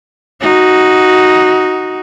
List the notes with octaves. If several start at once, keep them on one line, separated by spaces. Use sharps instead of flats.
D#4 F#4